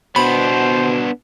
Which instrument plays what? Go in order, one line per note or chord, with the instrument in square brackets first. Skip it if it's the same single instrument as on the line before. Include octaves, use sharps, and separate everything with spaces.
[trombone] B2 [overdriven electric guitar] B3 D4 [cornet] C5 [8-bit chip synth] B5